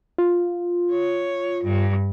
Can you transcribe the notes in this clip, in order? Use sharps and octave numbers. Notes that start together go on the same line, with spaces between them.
F4
C#5
G2